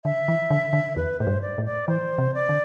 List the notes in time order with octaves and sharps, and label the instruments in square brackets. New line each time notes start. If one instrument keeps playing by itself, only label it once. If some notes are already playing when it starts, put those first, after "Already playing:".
[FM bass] D3 [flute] E5
[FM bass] E3
D3
D3
[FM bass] E2 [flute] B4
[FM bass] A2 [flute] C5
[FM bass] G2
[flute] D5
[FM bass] A2
[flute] D5
[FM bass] E3 [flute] C5
[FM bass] C3
[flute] D5
[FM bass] D3